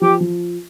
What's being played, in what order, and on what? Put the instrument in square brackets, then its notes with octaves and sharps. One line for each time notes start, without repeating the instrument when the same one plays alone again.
[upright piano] F3 [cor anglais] G4
[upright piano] F3